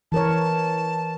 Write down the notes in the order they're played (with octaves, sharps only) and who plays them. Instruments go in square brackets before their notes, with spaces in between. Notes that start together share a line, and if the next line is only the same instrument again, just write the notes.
[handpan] E3 A#4 C#5 [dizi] A5